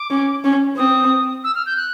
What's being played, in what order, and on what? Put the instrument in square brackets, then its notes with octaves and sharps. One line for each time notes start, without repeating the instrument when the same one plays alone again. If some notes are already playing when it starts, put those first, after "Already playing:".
Already playing: [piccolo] D6
[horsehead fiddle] C#4
C#4
[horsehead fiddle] C4 [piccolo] D#6
[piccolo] E6
F6
G6
F#6